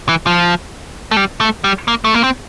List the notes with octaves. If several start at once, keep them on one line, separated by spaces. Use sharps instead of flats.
E3
F3
A3
G3
A3
G3
A#3
A3
A#3
C4